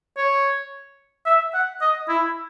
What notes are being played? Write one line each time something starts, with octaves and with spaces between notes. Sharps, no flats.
C#5
E5
F#5
D#5
E4